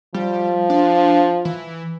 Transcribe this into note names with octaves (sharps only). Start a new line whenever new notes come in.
F3 G3
D4
E3